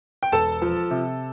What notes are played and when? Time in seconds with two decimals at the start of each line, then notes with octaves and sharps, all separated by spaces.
0.23 G5
0.32 E1 A4 A5
0.62 F3
0.91 C3